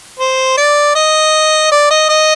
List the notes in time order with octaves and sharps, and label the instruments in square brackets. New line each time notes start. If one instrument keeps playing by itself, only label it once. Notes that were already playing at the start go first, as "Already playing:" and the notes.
[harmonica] C5
D5
D#5
D5
D#5
D#5